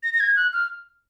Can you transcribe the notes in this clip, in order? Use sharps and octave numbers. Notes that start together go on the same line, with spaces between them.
A#6
A#6
G#6
F#6
F6